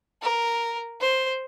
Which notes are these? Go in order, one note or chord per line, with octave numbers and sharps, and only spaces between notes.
A#4
C5